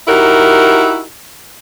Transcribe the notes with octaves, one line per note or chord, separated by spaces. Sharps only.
D#4 E4 F#4 G4 A#4